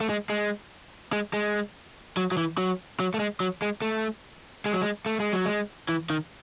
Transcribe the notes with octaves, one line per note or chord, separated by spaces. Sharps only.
A3
G#3
G#3
G#3
G#3
F#3
F#3
E3
F#3
F#3
A3
G#3
F#3
G#3
A3
G#3
F#3
G#3
A3
G#3
F#3
G#3
E3
D#3